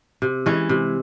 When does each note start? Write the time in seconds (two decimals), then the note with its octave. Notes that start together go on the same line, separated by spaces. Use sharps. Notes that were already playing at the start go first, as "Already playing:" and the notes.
0.22 C3
0.46 E3 G#3 C#4
0.69 C3